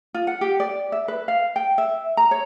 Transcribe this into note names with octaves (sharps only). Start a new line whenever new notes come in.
F4
F#5
G4
D5
E5
B4
F5
G5
E5
A#5
C#5